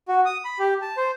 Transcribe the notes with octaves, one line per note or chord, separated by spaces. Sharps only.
F#4
D#6
B5
G4
A5
C5